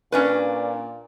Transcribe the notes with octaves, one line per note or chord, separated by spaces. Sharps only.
A#2 C#4 D4 B4